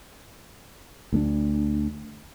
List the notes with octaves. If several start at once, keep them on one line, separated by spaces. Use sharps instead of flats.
D2 G#3 D4